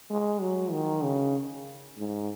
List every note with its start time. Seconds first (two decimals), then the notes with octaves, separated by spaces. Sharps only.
0.10 G#3
0.41 F#3
0.72 D#3
1.04 C#3
1.98 G#2